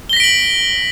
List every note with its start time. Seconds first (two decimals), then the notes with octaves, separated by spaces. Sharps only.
0.09 G7
0.13 A#6
0.17 B6
0.20 D7
0.24 F#7